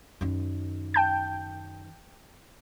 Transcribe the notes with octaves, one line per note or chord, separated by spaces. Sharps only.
F#2 D#3
G5 A5 G6